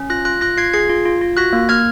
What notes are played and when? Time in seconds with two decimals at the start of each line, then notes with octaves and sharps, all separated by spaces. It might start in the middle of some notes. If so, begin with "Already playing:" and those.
Already playing: C#4
0.10 F4 F#6 A#6
0.25 F4 F#6 A#6
0.41 F4 F#6 A#6
0.57 F4 G#6 C7
0.73 G#4 G#6 C7
0.90 F4
1.06 F4
1.21 F4
1.37 F#4 F#6 A#6
1.53 A#3
1.69 A#3 F6 G#6